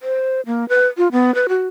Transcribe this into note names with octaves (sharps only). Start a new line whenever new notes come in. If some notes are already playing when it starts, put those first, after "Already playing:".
C5
A#3
B4
F4
B3
B4
F#4